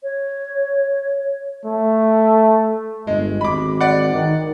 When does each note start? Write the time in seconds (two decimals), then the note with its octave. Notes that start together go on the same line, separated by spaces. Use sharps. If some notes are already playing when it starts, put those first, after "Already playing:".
0.03 C#5
1.65 A3
3.07 G1 G#3
3.41 G#1 B5 D6
3.81 D5 F#5
4.14 D#3